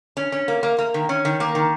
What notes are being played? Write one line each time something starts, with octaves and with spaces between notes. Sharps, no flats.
C#4
C#4
A#3
A#3
A#3
D#3
C#4
D#3
A#3
D#3